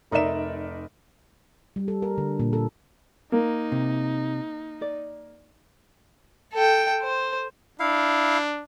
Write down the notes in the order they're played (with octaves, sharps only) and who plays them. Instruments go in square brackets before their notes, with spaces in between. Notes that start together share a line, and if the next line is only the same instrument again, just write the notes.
[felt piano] F1 D#4 A#4 D5 E5 E7
[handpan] G3
A4
A#4
D3
A#2
A4
[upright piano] A#3 [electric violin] D#4
[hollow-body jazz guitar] C3
D5
[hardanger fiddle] A4 G5
C5
[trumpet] D4 [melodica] E4 F5